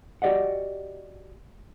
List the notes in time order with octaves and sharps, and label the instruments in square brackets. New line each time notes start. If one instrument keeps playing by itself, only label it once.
[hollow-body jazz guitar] F#4 G4 D5 D#5 F#5